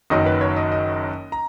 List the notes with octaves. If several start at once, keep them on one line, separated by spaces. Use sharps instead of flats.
F#1 F#2 D#3 F#3 D#5
B4
C#5
D#5
D#5
A#5